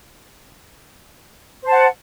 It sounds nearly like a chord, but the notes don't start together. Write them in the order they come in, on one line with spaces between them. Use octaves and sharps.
C5 A5 F#5